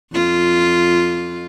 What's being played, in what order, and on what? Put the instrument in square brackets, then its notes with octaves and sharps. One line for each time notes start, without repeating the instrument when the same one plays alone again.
[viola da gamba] F2 F4